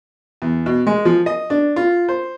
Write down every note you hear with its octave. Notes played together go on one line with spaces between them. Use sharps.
E2
B2
G#3
F3
D#5
D4
F4
C5